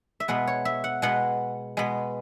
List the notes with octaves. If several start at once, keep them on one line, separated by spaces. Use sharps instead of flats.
E5
B2 G#3 B3 F#5
C#5
E5
F#5
B2 G#3 B3 F#5
B2 G#3 B3